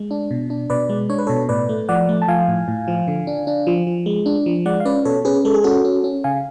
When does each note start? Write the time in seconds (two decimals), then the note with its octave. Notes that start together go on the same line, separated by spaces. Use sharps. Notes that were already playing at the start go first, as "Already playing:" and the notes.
Already playing: G#3
0.11 D4
0.31 B2
0.50 D4
0.70 B2 B4 D5
0.89 G#3
1.09 D4 C#5
1.18 B4
1.27 B2 A4 C#5
1.49 A2 B4 D5
1.69 A3
1.89 F3 D5 F#5
2.09 A3
2.22 A5
2.28 F3 F5 G#5
2.48 A2
2.68 A2
2.88 F3
3.08 D3
3.27 D4
3.47 D4
3.67 F3
3.87 F3
4.06 G#3
4.26 D4
4.46 F3
4.65 G#3 D5 F#5
4.80 F5
4.85 C#4 B4 D5
5.05 B2 A4 C#5
5.25 C#4 G#4 B4
5.45 G#3 A4
5.54 G#4
5.64 C#4 F#4 A4
5.85 C#4
6.04 C#4
6.24 C#3 F5 G#5